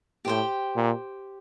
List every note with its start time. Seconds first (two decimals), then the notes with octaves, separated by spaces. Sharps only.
0.25 A2 G4 C5 G5
0.76 A#2